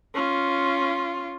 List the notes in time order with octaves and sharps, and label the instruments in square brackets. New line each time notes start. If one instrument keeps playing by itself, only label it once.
[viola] C#4 F4